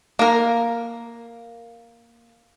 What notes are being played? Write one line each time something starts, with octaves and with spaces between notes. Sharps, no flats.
A#3 A#4